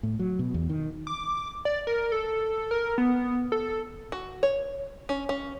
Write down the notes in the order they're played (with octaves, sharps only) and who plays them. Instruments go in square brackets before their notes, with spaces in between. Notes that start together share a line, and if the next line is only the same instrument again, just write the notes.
[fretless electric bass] A2
F#3
B2
E2
D#3
[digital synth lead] D6
D5
A#4
A4
A#4
B3
A4
[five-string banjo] F#4
C#5
C#4
C#4